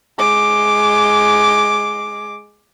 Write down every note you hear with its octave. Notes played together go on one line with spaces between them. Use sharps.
G#3 D6